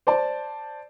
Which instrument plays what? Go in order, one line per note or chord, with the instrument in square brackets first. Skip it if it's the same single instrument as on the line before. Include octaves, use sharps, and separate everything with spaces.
[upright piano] C5 D5 A5